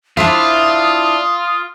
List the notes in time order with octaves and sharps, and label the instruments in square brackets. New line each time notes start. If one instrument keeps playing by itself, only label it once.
[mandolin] D4 E4 [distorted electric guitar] F4 [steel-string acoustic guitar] C5 E5 [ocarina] D#6